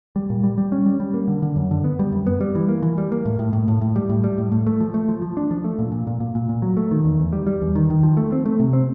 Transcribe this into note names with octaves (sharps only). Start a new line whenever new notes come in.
G3
A#2
G3
G3
C#4
G3
G3
A#3
D3
D3
F#2
D3
B3
G3
F#2
B3
G3
E3
A#3
E3
G3
A#3
A2
A2
A2
A2
A2
G3
A2
G3
A2
A2
A3
F3
A3
F3
F3
D4
F3
A3
A#2
A#2
A#2
A#2
A#2
A#2
F#3
A3
D#3
E2
E2
G3
G3
E2
D#3
D#3
F3
A3
C4
A3
C3
C4